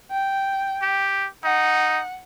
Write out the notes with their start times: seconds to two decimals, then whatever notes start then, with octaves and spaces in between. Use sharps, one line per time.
0.11 G5
0.82 G4
1.44 D#4 F#5